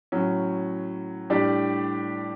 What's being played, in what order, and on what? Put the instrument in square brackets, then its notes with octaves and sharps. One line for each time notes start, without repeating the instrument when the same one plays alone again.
[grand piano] A2 F#3 C#4
A2 G3 D4 G4 D5